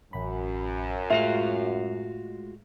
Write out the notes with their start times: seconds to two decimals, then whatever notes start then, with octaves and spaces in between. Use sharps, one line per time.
0.13 A1 F#2 B5
1.10 A2 G#3 A3 F4 F#4 E5 F5